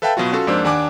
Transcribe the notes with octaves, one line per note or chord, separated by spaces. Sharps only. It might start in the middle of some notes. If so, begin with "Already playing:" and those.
A4 B4 E5 F5 G5 A5
B2 F#3 F4 F#4
C#4 F4 F#4 A4
F2 G#2 A#3 D4 C5 E6
D#2 D4 F#5 G#5 D6